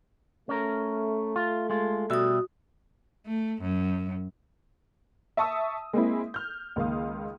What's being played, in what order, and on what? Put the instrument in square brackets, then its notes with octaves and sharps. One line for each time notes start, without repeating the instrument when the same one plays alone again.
[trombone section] A3 [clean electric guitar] C#4 A#4
[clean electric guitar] F4
G#3 F4
[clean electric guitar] B2 G3 E5 [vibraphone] F#4 D#6
[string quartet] A3
F#2
[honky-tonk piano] E5 A5 C#6 D#6 E6
G#3 A#3 C4 E4
F6 G6
C#2 D#3 A#3 F5 D#6